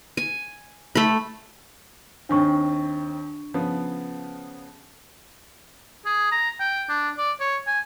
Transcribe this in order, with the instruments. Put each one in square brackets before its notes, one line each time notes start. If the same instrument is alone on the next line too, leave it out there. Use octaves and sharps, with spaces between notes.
[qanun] G#5
A3 B5
[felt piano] D#2 D#3 C4 [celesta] D4 C#6
[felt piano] C#3 F3 B3
[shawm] G#4
A#5
G5
D4
D5
C#5
G#5